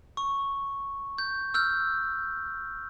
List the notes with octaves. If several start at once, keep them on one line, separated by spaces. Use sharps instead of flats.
C#6
G6
E6 F6 G6